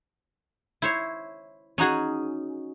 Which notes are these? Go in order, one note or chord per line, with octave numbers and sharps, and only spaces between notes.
E4 C5 C#5
C#4 D#4 F#4 G#4